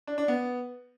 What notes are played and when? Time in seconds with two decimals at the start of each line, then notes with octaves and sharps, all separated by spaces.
0.07 D4
0.18 D4
0.28 B3